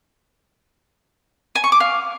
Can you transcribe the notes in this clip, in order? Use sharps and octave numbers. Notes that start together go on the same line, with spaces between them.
G#5
C#6
D6
F5